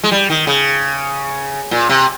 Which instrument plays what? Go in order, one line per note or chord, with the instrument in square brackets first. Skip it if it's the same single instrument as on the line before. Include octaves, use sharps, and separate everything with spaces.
[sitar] G#3
G3
D#3
C#3
A#2
C3